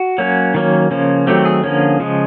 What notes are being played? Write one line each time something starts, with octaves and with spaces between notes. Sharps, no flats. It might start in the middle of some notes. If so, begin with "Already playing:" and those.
Already playing: F#4
F#3 A#3 C#4
D#3 F#3 A#3 C#4
C#3 F3 A#3 C#4
D#3 F#3 A3 C4 G4
G#4
D3 F3 A#3 C#4
C#3 F3 G#3